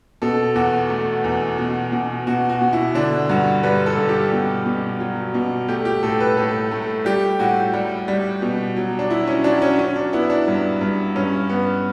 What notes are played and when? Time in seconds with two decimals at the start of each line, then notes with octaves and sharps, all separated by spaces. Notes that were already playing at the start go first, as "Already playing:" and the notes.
0.22 B2 A4
0.55 E2 F#4
0.90 A3
1.24 E2
1.58 B2
1.92 B2
2.27 B2 F#4
2.49 F#4
2.61 B2
2.73 E4
2.95 D3 D4
3.29 G2 F#4
3.63 G3 B4
3.86 A4
3.97 G2
4.09 G4
4.32 B2
4.66 B2
5.00 F#3
5.34 B2
5.68 A3 G4
5.85 G4
6.03 A2 A4
6.20 B4
6.37 A2 A4
6.71 A3
7.05 G3 G4
7.39 A2 F#4
7.74 G3
8.08 G3
8.42 B2
8.76 F#3
8.99 D4
9.10 F#3 E4
9.27 C#4
9.44 F#3 D4
9.62 C#4
9.79 F#3 C#4
9.96 D4
10.13 B3 E4
10.30 D4
10.48 G2
10.81 G2
11.16 G2 C#4
11.50 B3